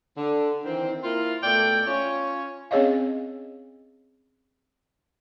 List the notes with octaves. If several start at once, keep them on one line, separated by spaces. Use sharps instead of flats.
D3
D#3 E3 C4
A#3 E4 F4
B2 A3 A4 D5 G5
C#4 F4 C#5
C4 C#4 G#4 C#5 D#5 F5